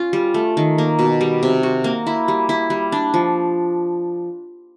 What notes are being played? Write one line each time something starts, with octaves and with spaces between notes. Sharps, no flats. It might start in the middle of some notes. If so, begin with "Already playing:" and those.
Already playing: C#4 F4
G3
A3
D#3
A#3
B2
G3
C3
F#4
A#3
E4
G3
E4
G3
D4
F3